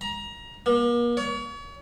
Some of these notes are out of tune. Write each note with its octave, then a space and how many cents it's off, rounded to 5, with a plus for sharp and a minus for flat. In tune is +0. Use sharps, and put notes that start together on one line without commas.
A#5 +25
A#3 +40
C#5 +40